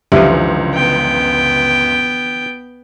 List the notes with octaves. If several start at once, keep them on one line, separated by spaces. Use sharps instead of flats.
C#2 F#2 D3 E3 F3 G4 E5
B3 G5